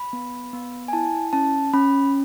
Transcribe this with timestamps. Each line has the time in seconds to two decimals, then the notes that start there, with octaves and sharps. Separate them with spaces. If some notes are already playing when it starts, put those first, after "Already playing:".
Already playing: B5
0.13 B3
0.53 B3
0.88 G#5
0.93 E4 A5
1.33 C#4 A5
1.73 C#4 B5